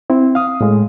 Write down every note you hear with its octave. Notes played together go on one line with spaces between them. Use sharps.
C4 E4
F5 D#6
A2 G#3